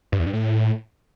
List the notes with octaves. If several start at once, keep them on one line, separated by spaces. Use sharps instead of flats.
G2
E2
G2
A2